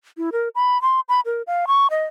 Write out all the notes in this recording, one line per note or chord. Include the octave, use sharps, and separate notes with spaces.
E4
A#4
B5
C6
B5
A#4
F5
C#6
D#5